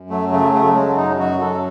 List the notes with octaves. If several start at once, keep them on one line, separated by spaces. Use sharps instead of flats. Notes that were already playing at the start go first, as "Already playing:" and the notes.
Already playing: F#2
F#3 A3
C#3 A3
C#3 A3
F#3 G#3
F#2 D#4
F#3 F#4
F#2 A4